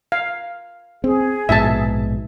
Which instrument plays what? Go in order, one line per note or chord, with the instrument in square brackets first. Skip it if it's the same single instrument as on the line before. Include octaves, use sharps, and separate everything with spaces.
[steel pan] F5
[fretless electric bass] C4 [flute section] G#4
[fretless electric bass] A#1 G#2 B2 [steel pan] E5 A5